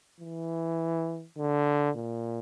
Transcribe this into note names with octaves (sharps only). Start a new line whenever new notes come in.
E3
D3
A#2